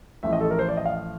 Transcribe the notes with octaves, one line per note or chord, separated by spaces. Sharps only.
A1 A2 F3 E5
D#5
A4
A#4
C5
D5
D#5
F5